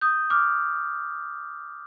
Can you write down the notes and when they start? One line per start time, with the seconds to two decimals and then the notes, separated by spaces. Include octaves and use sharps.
0.01 D#6 G6
0.30 D6 F6